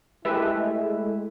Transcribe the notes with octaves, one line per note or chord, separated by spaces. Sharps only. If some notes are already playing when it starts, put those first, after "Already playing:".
G#3 A3 E4 G4 B4 E5